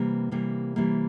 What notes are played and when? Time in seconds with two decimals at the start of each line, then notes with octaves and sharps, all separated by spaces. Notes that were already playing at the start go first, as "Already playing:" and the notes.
Already playing: C3 E3 G3 A#3
0.31 C3 E3 G3 A#3
0.76 C3 E3 G3 A#3